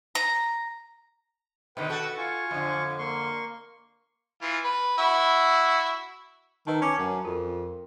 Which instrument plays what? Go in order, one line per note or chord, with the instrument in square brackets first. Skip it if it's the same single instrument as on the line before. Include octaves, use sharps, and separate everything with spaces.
[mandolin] A#5
[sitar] B2 D3 D#3 [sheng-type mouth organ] B4 G5
[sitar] F#4 A4
[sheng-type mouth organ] F4 G#5 C#6
[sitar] F2 D3
[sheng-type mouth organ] A#3 C6 C#6
[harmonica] E3 F4
B4
E4 F#4 E5
[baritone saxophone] D#3 [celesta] B4 D#5 A5
[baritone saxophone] C#4 [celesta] A5 D6
[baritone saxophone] F#2
[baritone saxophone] F2 [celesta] A#4